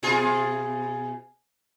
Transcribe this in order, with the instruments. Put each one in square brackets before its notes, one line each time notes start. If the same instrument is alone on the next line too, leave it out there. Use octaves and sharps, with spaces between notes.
[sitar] B2 F4 G#4